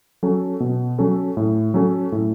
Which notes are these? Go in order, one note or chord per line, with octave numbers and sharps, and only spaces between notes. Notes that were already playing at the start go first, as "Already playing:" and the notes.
F#3 C#4 A4
B2
F#3 C#4 A4
A2
F#3 C#4 A4
A2